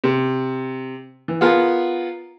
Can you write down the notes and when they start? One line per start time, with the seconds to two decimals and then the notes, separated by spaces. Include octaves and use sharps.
0.04 C3
1.28 E3
1.41 B3 F4 G#4 A#4 F#5